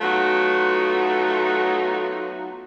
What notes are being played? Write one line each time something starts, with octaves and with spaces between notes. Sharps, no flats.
F#3 A3 B3 D#4 F4 F#4